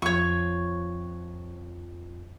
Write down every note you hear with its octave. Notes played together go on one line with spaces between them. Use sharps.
F2 F4 C#5 C#6